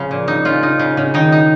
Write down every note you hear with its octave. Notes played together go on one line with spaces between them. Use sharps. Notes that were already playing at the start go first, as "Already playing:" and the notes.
Already playing: C#3 F3
A#2
D#4
C#3 F4
D#4
C#3
C#3
D#3 D#4
D#4